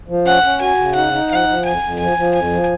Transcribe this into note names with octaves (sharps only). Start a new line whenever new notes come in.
F3
C#4 F#5
C#4
F#4 G#5
C#3
D#4 F#5
D#4
F3 F#5
F3
F2 G#5
F2
F3 G#5
F3
F2 G#5
F3